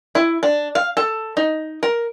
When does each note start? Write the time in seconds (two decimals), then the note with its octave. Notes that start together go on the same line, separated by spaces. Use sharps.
0.15 E4
0.43 D4
0.75 F5
0.97 A4
1.37 D#4
1.83 A#4